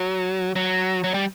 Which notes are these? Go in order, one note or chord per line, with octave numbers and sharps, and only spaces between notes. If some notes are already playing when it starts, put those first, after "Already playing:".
Already playing: F#3
F#3
F#3
G3